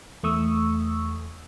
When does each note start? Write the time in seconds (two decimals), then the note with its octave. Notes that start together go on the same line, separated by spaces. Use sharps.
0.23 E2 A3 C#6 D#6 E6